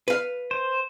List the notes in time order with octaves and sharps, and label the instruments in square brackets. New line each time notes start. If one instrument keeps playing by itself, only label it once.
[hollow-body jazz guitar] B4 F5
[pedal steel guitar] C5